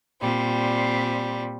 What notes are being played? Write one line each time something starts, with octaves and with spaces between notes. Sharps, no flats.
A#2 G3 C4